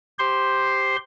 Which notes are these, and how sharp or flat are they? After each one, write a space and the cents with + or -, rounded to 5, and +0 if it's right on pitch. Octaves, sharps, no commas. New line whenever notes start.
G4 +0 C5 +0 C6 +0